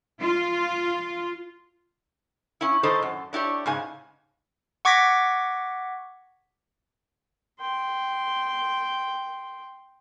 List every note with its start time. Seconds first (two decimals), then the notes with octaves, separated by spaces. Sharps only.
0.20 F4
2.61 C#4 E4
2.83 A2 D#3 A4 C5 D#5 A5
3.03 F#2
3.33 D4 E4 G4 C#5
3.66 G#2 C#3 G#5
4.85 F#5 C#6 D6 G#6 A#6 B6
7.61 G5 C6